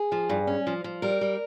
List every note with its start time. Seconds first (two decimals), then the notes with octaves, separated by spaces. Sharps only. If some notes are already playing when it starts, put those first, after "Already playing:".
Already playing: G#4
0.12 F3
0.29 G2
0.47 C#4
0.67 F3
0.84 F3
1.02 G3 A#4
1.21 G3